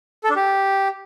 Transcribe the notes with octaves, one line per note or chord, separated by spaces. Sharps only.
A4
D4
G4